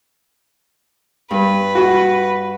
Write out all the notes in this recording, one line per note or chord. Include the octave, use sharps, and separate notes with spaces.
G2 B4
F#4